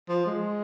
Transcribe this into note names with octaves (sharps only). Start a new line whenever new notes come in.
F3
G#3